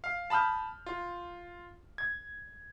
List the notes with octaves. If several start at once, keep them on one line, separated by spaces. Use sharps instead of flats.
F5
A5 B5 D#6 F6 G6
F4
G#6